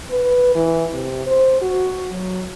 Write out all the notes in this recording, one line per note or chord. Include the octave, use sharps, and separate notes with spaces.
B4
E3
C3
C5
F#4
F#3